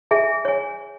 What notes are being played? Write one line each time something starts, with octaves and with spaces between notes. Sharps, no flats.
G#4 E5 G#5 A5
C#5 G#5